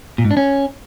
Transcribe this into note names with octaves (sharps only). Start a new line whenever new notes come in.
A#2
G#2
D4
C#4